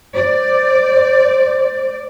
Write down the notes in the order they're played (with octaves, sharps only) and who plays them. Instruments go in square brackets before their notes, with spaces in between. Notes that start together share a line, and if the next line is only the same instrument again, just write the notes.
[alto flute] C5 [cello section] D5